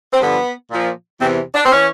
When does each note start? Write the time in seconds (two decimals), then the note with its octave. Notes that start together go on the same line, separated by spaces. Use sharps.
0.13 C4
0.20 G2 D3 F3 B3
0.71 A#2 F3
1.21 E2 C3 E3 C4
1.55 D4
1.65 C4
1.72 E3 C#4